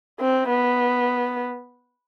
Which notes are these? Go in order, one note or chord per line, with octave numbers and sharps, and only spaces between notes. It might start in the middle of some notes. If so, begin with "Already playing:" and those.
C4
B3